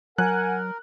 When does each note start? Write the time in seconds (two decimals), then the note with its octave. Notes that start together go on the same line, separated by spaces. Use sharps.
0.18 F#3 A#4 F#5 G#5 F#6